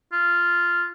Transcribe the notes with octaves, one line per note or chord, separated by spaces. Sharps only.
F4